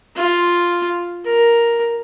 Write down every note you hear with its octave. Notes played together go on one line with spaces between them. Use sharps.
F4
A#4